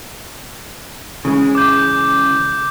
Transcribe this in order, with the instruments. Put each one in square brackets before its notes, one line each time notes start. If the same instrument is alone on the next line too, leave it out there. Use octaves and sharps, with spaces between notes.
[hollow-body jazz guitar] C#3 E3 G#3
[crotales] D6 G6